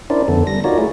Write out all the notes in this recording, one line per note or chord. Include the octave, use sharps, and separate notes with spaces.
C#4 D4 E4 A#4 C5 D5
F2 D3 B3 A4
G3 A#6
D#4 F4 F#4 A#4 C#5 D5
A3 E4 G#4